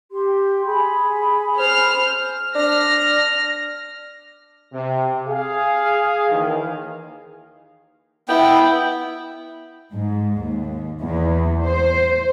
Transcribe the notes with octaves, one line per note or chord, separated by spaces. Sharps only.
G4 C6
G#4 G#5 B5
C5 F6
D4 F6 A#6
C3
G#4 F5
D#2 D#3 E3
B3 E4 G5
G#2
D#2
E2
C5